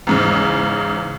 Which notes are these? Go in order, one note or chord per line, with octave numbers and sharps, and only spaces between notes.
E2 G#2 C#3